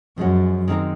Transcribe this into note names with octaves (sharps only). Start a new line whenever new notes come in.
F#2 F3 G#3 C#4 F#4
D#3 G#3 C4 D#4 A#4